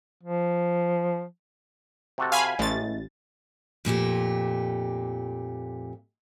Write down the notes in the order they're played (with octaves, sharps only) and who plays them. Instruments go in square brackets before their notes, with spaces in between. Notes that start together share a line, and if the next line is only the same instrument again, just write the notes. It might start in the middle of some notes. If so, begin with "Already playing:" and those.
[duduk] F3
[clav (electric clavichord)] C3 F#4 A4
[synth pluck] F5 G#5 B5
[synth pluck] A1 A6 [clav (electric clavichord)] G#3 A3
[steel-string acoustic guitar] F2 A#2 A3 G4